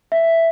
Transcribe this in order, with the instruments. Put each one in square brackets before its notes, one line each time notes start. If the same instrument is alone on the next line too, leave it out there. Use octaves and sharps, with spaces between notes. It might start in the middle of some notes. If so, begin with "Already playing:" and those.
[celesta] E5